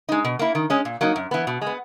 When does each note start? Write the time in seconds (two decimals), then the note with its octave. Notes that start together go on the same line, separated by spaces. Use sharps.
0.09 G#3 D#4
0.25 B2
0.39 A#3 E4
0.55 D#3
0.70 G#3 C#4
0.85 A#2
1.01 F#3 A#3 D#4
1.16 F#2
1.31 E3 B3
1.47 B2
1.62 G#3
1.67 B3